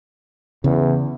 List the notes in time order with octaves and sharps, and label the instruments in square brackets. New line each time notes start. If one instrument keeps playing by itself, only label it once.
[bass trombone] E2 [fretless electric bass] C#3